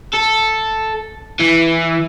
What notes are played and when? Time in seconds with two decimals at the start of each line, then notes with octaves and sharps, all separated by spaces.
0.13 A4
1.40 E3